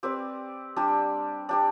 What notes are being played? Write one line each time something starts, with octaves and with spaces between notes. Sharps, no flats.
C4 G4 B4 D5
G3 D4 G4
D4 G4 D5